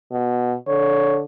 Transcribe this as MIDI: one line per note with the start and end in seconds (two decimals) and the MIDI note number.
0.12 0.54 47
0.68 1.23 50
0.68 1.21 73